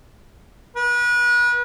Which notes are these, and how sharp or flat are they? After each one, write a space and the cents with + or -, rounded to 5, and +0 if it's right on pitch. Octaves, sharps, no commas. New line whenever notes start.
B4 -35